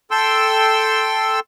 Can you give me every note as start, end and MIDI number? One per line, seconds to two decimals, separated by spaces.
0.11 1.40 69
0.11 1.40 79
0.11 1.40 84
0.11 1.40 88